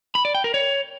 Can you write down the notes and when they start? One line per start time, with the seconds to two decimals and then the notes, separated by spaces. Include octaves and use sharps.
0.15 B5
0.25 D5
0.35 G5
0.44 A#4
0.54 C#5